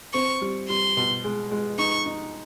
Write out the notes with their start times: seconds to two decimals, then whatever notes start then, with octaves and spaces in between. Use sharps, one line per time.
0.13 C4 C#6
0.41 G3
0.69 G3 C6
0.97 B2
1.24 G#3
1.51 G#3
1.78 D#4 C#6
2.06 D#4